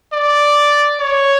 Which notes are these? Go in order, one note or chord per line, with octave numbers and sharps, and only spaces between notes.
D5
C#5